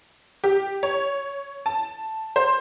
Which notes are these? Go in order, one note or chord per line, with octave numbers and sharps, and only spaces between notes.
G4
C#5
A5
C5